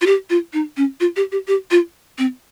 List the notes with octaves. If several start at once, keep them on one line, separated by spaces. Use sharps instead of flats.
F4
G4
F4
D#4
C#4
F4
G4
G4
G4
F4
C4